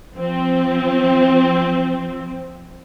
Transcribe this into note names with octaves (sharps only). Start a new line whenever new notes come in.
F3 C4